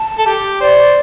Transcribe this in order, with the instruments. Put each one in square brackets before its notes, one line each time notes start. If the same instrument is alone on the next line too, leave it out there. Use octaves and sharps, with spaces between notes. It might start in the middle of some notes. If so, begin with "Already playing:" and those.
Already playing: [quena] A5
[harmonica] A4
G4
[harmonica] C5 [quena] D5